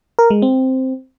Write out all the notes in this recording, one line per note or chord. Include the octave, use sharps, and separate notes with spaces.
A#4
G#3
C4